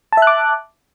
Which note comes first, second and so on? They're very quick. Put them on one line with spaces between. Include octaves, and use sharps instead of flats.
A5 E5 F#6 D6